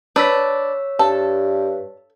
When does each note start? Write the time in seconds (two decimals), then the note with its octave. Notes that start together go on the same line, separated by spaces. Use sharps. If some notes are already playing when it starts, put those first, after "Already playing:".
0.16 D4 B4 C#5 E6 B6
0.99 G2 A4 A5